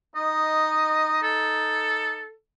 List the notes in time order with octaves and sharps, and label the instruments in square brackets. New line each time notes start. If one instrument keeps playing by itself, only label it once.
[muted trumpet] D#4 [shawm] D#5
[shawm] A4